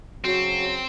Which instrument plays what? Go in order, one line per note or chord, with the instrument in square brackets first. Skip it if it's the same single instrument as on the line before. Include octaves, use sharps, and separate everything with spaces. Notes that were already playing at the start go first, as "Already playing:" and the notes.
[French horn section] C#3 F#3 [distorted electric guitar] C4 [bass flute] F#4